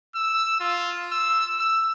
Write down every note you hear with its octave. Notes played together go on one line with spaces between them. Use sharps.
E6
F4
E6
E6